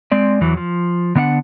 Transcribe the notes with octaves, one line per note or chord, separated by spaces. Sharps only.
G#3 C4 D5
E2 E3 F#3
F3
D3 B3 D4 F5 F#5